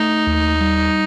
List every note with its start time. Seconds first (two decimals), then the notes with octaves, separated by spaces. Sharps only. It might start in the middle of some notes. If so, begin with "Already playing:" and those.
Already playing: A3 D#4
0.27 D#2
0.61 G3